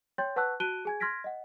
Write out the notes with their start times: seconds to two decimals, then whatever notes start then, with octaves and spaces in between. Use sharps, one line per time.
0.18 C#5 G5 C6 G6 A6
0.36 B4 F#5 A5 C#6 E6 F#6
0.60 F#4 A5 F#6 D7 D#7 G7
0.85 G#4 G#5 G#6
1.00 C6 F6 G#6 A#6 B6 D7
1.24 D#5 F#5